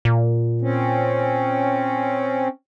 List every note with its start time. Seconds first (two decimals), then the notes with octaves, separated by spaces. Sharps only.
0.05 A#2
0.61 C4 C#4